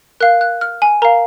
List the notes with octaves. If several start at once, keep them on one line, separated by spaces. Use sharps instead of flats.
A#4 F5 F#6
F#6
F6
G#5
A#4 F5 A#5